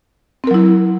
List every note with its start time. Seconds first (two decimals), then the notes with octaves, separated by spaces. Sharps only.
0.44 C4
0.47 A#4
0.51 F#3
0.54 E4